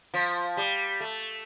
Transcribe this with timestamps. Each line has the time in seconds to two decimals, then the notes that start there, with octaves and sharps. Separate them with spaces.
0.14 F3
0.57 G3
1.01 A3